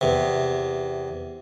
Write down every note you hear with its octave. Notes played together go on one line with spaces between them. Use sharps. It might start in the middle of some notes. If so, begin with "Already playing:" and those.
E2 C3